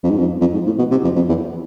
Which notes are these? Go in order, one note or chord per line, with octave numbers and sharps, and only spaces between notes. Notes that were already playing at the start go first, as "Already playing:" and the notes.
F2
G#2
F2
F2
G#2
A2
B2
C3
F2
F2
E2